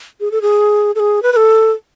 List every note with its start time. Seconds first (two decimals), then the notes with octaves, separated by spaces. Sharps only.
0.20 G#4
0.31 A4
0.42 G#4
0.95 A4
0.99 G#4
1.22 B4
1.33 B4
1.36 A4